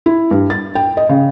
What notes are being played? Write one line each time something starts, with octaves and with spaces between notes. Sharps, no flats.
E4
G2
A6
G5
D#5
C#3